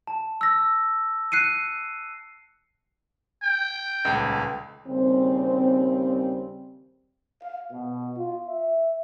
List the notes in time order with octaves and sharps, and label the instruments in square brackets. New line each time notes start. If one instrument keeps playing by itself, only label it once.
[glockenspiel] A5
E6 A#6
F#6 C7 C#7 D#7
[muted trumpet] G5
[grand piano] D#1 C#2
[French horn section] D#2 C#3 G3 C4
[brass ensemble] F5
B2
F4
E5